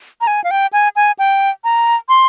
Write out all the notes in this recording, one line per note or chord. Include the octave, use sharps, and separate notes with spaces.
A#5
G#5
F5
G5
G#5
G#5
G5
A#5
C6